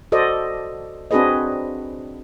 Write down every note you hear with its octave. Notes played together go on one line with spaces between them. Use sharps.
F#4 A4 C5 D5 D#5
C4 D4 F#4 G#4 B4 D#5